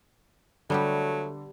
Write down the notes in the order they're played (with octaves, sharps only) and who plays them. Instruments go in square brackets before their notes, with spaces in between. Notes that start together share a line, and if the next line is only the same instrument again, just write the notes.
[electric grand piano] D3 [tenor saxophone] F#3 [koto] G3 B3 G4 [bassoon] A3